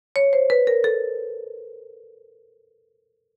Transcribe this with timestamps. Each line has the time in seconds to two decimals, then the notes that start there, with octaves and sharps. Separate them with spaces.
0.16 C#5
0.33 C5
0.50 B4
0.67 A#4
0.84 A4